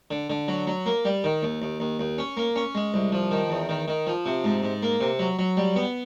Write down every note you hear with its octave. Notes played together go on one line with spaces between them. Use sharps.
D3
D3
F#3
F#3
A#3
G3
D#3
D#2
D#2
D#2
D#2
C#4
A#3
C#4
G#3
C2
F3
D#3
E2
D#3
D#3
F3
C3
G#2
G#2
A#3
C3
F#3
F#3
G3
B3